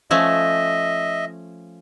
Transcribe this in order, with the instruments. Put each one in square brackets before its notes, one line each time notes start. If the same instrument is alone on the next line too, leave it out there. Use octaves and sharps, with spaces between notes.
[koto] F3 A3 C#4 [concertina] D#5 E5